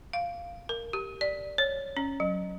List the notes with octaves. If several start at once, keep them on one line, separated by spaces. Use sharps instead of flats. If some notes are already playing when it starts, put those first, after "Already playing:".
F5
A#4
G4
D5
C#5
C#4
F#3